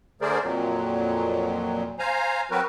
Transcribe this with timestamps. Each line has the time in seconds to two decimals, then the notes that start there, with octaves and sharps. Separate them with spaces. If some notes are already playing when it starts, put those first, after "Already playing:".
0.21 D3 A3 G#4 A#4 C5 D5
0.42 F2 A#2 F#3
1.99 C5 F5 G#5 A#5
2.51 F#3 C4 F#4 A#4 B4